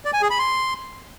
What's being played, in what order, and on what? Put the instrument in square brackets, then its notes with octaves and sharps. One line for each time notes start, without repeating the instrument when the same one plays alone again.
[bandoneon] D5
G#5
G#4
B5
C6